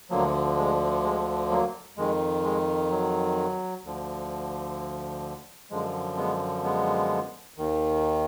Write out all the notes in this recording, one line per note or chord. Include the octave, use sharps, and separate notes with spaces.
D2 D3 F3 F#3 A#3
G#3
G#3
F#3 A#3
F2 D#3 G#3
G#3
F#3
D2 D3 F3
F#2 D3 F3 G#3
G#3 B3
G#3 B3
D#2 D#3